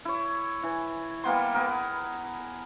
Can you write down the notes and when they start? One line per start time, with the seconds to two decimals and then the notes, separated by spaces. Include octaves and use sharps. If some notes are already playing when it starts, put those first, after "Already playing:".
0.05 E4 C#5
0.63 E3
1.24 G3 A#3 B3 C6
1.54 B3 G#4 A#4